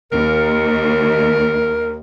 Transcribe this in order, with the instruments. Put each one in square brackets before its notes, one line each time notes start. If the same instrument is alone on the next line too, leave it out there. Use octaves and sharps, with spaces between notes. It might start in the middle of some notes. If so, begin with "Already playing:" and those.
[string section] D#2 [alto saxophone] A#4